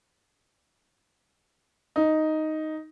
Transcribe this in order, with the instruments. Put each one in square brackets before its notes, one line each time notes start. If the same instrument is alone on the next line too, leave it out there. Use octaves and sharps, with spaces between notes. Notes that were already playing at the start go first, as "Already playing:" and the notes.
[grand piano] D#4